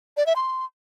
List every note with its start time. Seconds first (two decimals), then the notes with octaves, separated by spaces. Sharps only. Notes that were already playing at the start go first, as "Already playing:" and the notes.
0.17 D5
0.26 E5
0.36 C6